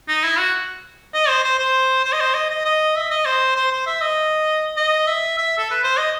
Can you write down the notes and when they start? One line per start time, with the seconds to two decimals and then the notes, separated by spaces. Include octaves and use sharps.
0.08 D#4
0.24 E4
0.39 F#4
1.14 D#5
1.29 C5
1.44 C5
1.59 C5
2.04 C5
2.13 D#5
2.21 C5
2.34 D#5
2.50 D#5
2.65 D#5
2.96 E5
3.10 D#5
3.26 C5
3.56 C5
3.71 C5
3.86 E5
4.01 D#5
4.77 D#5
5.07 E5
5.37 E5
5.58 A4
5.71 B4
5.84 C5
5.97 D#5